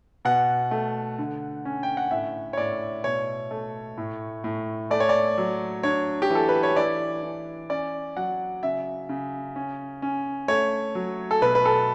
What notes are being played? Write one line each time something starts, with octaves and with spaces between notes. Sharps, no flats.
B2 F#5
A3
D3
C#4
G5
F#5
A2 E5
C#5
A2 D5
B2 C#5
A3
A2
A2
A3 D5
C#5
D5
F#3
D4 C#5
G4
E3
A4
B4
C#5
E3 D5
E3
C#4 D5
F#3 F#5
C#3 E5
C#3
C#4
C#4
A3 C#5
F#3
A4
B2 B4
B4
A4